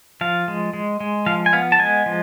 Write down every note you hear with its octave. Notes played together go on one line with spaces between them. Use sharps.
F3 F5
G#3
G#3
G#3
F3 F5
G#5
B3 F5
A5
G#3 G#5
F3